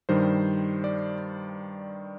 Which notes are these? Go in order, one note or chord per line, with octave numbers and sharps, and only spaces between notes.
G2 D#3 G3 C5
D5